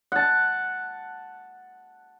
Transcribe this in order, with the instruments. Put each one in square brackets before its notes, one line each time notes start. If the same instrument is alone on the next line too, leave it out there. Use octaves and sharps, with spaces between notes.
[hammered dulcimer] F#5 A5